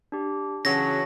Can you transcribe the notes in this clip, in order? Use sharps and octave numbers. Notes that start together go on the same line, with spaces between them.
D4 G4
C#3 E3 F#3 A5 G#6 A#6